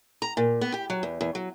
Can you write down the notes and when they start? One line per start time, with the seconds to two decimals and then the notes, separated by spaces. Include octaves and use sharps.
0.22 A#5
0.37 A#2
0.61 B3
0.74 G4
0.90 F#3
1.03 E2
1.21 E2
1.35 F#3